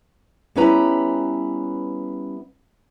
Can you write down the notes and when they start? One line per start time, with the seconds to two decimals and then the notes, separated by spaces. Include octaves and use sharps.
0.56 G3 B3 C#4 E4 B4 A#5